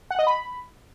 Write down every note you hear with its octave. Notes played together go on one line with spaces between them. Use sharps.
F#5
D#5
B5